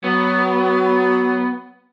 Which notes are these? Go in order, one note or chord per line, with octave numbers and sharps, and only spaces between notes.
F#3 B3